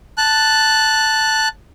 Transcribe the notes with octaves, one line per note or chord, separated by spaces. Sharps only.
A5 F#6